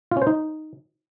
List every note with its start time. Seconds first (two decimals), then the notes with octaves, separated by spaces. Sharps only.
0.11 F4
0.17 C#4
0.22 C5
0.27 D#4